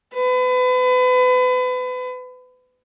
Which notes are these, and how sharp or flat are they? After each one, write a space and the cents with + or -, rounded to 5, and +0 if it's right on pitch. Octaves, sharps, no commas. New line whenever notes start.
B4 +35